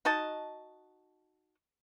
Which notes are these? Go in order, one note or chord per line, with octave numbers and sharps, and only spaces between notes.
D#4 F#4 D#5 A5